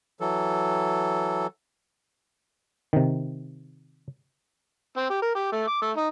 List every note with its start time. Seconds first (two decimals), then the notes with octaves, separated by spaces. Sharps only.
0.20 E3 F#3 A4
2.93 C3 D#3
4.97 C4
5.10 G4
5.22 A#4
5.35 G4
5.52 A3
5.67 D6
5.82 A3
5.97 D#4